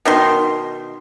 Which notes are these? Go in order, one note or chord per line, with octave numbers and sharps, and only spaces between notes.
B2 D#3 C6